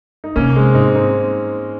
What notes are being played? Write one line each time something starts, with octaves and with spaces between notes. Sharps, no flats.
D#4
C3 A#3 C#4
G#3 C4
G#2 C4 D#4
C4 D#4